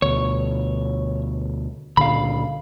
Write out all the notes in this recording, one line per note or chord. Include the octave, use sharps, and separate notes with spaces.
D2 B2 C#5
C#2 A#2 D3 F5 B5